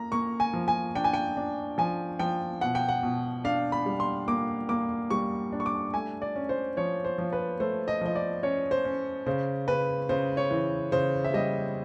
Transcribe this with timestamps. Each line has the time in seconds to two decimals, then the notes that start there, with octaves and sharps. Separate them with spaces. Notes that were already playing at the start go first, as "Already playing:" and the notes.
Already playing: A#3 A#5
0.12 A#3 C#6
0.40 G#5
0.53 F3
0.68 G#5
0.95 D4 G5
1.04 G#5
1.13 G5
1.37 D4
1.78 F3 G#5
2.19 F3 G5
2.61 B2 F#5
2.75 G5
2.89 F#5
3.03 B2
3.44 D4 F5
3.72 B5
3.86 G3
4.00 C6
4.28 A#3 D6
4.69 A#3 D6
5.10 G3 C#6
5.52 D4
5.60 C#6
5.66 D6
5.94 A3 G#5
6.22 D5
6.36 C#4
6.49 C5
6.77 F3 C#5
7.05 C5
7.18 F3
7.33 B4
7.60 A3 C5
7.88 D#5
8.01 F3 D#5
8.15 D5
8.43 C#4 C#5
8.71 C5
8.85 C#4
9.26 C#3 C5
9.68 C#3 B4
10.09 C#3 C5
10.37 C#5
10.51 E3
10.92 C#3 C5
11.24 E5
11.34 G3 D#5